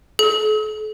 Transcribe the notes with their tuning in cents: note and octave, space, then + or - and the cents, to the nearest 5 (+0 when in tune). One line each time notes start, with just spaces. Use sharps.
A4 -45